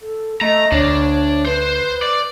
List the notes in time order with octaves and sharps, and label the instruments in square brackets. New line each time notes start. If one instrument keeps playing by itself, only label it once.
[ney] A4
[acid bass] A3 [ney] D#5 [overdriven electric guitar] A#5
[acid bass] D2 [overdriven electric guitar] D4 [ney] C#5
[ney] B4 [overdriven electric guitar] C5
[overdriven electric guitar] D5